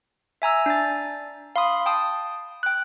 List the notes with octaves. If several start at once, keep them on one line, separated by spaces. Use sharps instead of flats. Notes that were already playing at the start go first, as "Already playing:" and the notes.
E5 G#5 A#5 E6
D4 A6
F5 B5 C6 D#6
G5 A5 D#6
G5 F#6